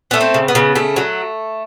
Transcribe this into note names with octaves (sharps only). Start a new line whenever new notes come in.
A3 B3
C4
C#3
B3
C#3
C#3 A3
F#3